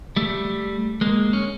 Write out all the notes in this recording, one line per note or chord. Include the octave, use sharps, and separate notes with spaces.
G3 A3
G#3 A#3
C#4